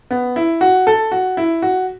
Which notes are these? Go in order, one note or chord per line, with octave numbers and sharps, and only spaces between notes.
B3
E4
F#4
A4
F#4
E4
F#4